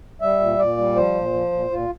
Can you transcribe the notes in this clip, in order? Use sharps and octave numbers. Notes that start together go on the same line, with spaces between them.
G3 E5
A#2
A#2 D5
G3
F3 C5
A#2
F3
A#2
A#2 F4